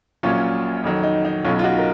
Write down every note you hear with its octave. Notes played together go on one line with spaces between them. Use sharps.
A#1 A#2 F#3 C#4 F4
F2 D#3 F#3
D#4
D#4
B1 B2 F#3 C#4 F4
F4
D#4 F#4
A#4